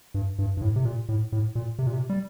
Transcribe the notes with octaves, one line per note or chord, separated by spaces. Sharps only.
G2
G2
G2
A2
C3
A#2
A2
A2
A#2
C3
A#2
C3
G3